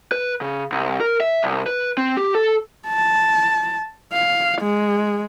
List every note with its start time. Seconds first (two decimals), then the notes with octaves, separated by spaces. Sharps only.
0.12 B4
0.41 C#3
0.72 C2
1.00 A#4
1.20 E5
1.43 C2
1.66 B4
1.98 C4
2.17 G4
2.35 A4
2.88 A5
4.13 F5
4.61 G#3